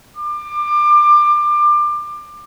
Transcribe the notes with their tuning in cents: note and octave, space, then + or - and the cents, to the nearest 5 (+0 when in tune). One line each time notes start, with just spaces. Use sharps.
D6 +25